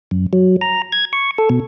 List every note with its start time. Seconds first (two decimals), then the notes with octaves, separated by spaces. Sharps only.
0.11 F#2
0.33 F#3
0.61 A#5
0.92 G#6
1.13 C#6
1.38 A4
1.50 B2